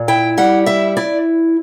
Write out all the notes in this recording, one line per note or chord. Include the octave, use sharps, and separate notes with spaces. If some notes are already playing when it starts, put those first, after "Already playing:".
Already playing: A#2
E4 G5
G3 F#5
E4 E5
E4 D5